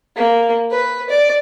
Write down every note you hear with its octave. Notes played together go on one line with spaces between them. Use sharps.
A#3
B4
D5